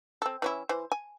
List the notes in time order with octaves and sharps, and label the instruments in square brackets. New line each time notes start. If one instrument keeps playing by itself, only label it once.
[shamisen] C4 A4
E3 C#4 E4
E3 C5
G#5